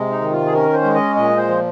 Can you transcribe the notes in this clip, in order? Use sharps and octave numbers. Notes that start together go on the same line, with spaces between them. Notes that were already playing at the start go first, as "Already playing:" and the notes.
Already playing: C3 G#3
D#4
D#3
F4
G#4
C#4 A#4
C5
G#3
D#5
A#2 D#5
C5
F3